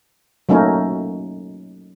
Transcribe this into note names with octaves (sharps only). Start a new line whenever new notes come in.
F#3 A3 A#3 C#4 D#4